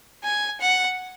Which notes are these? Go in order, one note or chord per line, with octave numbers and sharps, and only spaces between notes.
G#5
F#5